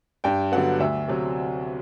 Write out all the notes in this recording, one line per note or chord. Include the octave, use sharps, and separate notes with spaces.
G2 G5
D3 F#3 B3 F#5
D2 E5
C3 F#3